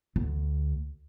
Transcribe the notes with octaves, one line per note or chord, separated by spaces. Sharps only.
D2